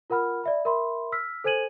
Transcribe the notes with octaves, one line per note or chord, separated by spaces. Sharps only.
F4 A#4 F#5 B5 F6
D5 E5 B5
A#4 E5 B5 C6
E6 F6 B6
A4 C5 G#5 G#6 D#7 F#7